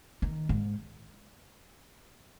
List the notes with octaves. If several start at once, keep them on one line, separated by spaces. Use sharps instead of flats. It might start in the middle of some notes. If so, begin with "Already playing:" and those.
D#3
G#2